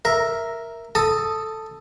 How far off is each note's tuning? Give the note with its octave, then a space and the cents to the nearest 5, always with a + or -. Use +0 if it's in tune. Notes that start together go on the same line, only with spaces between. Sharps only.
A#4 +0 E5 +0
A4 +5 A5 +0 D#6 +0